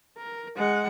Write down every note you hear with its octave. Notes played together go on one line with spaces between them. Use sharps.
A#4
G#3 F#5